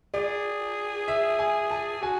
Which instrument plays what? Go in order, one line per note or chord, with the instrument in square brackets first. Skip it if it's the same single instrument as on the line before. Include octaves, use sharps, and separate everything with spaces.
[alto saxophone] G#4 [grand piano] D5
[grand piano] E5
G#5
A5
[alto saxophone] F#4 [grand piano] G#5